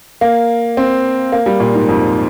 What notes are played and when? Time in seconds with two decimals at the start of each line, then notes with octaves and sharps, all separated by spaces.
0.21 A#3
0.77 C4
1.32 A#3
1.46 G3
1.60 A#2
1.75 G#2
1.89 F2